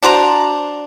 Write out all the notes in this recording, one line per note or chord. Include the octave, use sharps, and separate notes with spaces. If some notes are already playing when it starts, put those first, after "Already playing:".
D4 F#4 C5 A#5